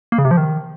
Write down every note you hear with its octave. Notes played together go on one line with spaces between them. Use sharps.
A#3
C#3
C3
F3
D#3